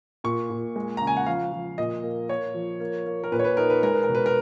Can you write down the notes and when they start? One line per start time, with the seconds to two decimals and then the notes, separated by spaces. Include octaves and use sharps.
0.24 A#2 C#6
0.50 A#2
0.76 G#3
0.97 C#3 A#5
1.07 G#5
1.17 F#5
1.26 F3 F5
1.52 F3
1.78 A#2 D#5
2.03 A#3
2.29 A#3 C#5
2.54 F3
2.80 A#3
3.06 A#3
3.24 A#4
3.32 A#2 B4
3.39 C#5
3.44 B4
3.57 D#4 A#4
3.70 B4
3.83 G#3 A#4
3.93 B4
4.03 A#4
4.09 B2
4.15 B4
4.26 A#4